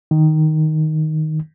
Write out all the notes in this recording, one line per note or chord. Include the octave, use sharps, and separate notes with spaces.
D#3